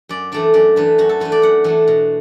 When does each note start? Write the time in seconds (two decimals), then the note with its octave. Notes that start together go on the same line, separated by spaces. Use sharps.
0.09 F#2 D5
0.32 E3 A3 D4 D5
0.54 F#2 D5
0.76 E3 A3 D4 B4
0.98 F#2 F#4
1.09 A4
1.20 E3 A3 D4 B4
1.32 D5
1.42 F#2 F#5
1.64 E3 A3 D4
1.88 B2